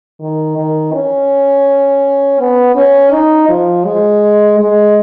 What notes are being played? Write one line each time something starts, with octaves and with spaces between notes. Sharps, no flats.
D#3
D#3
C#4
B3
C#4
D#4
F3
G#3
G#3